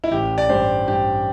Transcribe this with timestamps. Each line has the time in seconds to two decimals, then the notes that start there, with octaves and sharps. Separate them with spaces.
0.04 E4
0.11 A1 G4
0.38 D5
0.49 G2 G4 C5
0.88 G2 G4